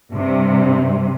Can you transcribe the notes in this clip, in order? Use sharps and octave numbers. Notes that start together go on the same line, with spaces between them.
G2 C3